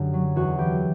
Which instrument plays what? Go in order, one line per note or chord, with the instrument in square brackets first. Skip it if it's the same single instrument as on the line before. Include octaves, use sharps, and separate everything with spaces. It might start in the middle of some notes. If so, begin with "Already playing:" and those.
Already playing: [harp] F#2 D3 G4
F#3
E2 F#4
E3 G4